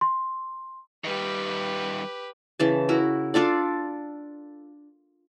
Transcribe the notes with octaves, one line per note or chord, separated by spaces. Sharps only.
C6
D#3 G3 G4 B4
C#3 E3 A5
E4 F#4 A#4
D4 F4 A4 D5